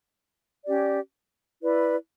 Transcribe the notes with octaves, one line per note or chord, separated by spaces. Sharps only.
C#4 G4 D5
E4 B4 D5